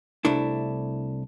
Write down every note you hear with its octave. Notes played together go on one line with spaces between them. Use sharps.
C2 A3 D4 E4